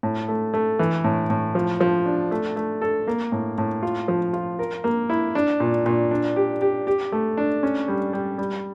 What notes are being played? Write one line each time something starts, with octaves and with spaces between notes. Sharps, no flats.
A2
A3
A3
E3
A2
A2
F3
F3
D4
A3
A3
A4
A#3
A2
A2
F4
F3
F4
A#4
A#3
E4
D4
A#2
A#2
D4
G4
G4
G4
A3
D4
C#4
G3
G3
G3